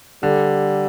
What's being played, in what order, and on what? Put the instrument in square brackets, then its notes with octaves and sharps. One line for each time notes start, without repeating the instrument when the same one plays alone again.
[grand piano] D3 [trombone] G3